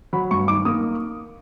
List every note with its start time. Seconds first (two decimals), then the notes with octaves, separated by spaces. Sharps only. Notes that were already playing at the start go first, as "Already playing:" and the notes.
0.13 F#3 B5
0.31 G2 C#6
0.48 D#3 D6
0.65 A#3 D#6